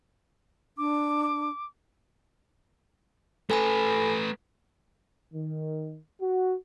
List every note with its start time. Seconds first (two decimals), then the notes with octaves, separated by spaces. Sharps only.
0.78 D4 D6
3.50 A3 A4 B4 G#5 B5
5.33 D#3
6.21 F#4